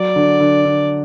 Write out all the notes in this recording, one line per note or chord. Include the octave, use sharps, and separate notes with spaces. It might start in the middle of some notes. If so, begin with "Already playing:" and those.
Already playing: F#3 D5
D3
D3
D3